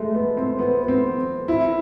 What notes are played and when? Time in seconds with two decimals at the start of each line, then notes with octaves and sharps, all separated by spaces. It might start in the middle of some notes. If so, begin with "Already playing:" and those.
Already playing: G#3 A3
0.15 B3
0.37 C4
0.59 B3
0.83 B3
0.88 C4
1.48 E4